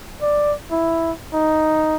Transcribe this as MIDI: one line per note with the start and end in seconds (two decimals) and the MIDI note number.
0.22 0.54 74
0.71 1.12 64
1.33 1.96 63